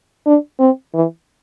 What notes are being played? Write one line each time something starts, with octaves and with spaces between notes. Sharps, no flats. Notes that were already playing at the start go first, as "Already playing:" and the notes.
D4
C4
E3